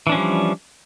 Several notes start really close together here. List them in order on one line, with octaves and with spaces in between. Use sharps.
E3 D4 C#4 F3 G3